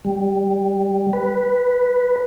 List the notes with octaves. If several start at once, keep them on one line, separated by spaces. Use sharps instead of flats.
G3
B4